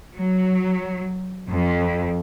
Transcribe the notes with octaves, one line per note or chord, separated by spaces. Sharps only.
F#3
F2